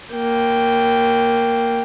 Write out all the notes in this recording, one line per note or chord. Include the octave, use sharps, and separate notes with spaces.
A#3 G5